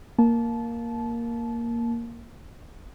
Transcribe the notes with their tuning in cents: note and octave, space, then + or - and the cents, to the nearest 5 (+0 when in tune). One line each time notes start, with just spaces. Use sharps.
A#3 +0 A5 -25